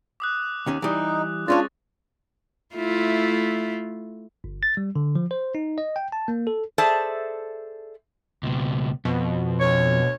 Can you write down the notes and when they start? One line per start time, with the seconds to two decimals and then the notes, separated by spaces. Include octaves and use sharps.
0.20 D6 D#6 F#6
0.66 D#2 D#3 C#4
0.82 E3 G3 D#4
1.48 G#3 C#4 D4 F4 C#5 A6
2.75 A3 E4 F4
4.44 G1
4.63 A6
4.77 G3
4.96 D3
5.15 F3
5.31 C5
5.55 D#4
5.78 D#5
5.96 G5
6.12 A5
6.28 A#3
6.47 A4
6.78 G#4 A4 C5 D5 E5 A5
8.43 C#2 B2
9.05 F2 B2
9.60 D2 C#5